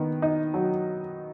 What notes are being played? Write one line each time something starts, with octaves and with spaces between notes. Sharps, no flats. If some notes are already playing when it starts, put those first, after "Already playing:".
Already playing: D#3 B3
D#4
F#3